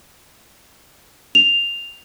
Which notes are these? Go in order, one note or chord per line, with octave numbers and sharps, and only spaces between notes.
F7